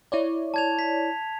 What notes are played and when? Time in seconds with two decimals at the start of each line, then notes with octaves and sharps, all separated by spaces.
0.12 E4 C#5 D5
0.54 A5 G#6 F7
0.79 B6